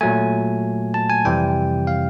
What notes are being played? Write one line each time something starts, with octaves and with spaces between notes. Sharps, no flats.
A#2 F#3 A3 G#5
A5
G#5
F2 C3 E3 G3 G5
F5